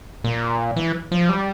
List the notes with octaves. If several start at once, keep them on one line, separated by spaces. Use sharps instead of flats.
A#2
E3
F3
G3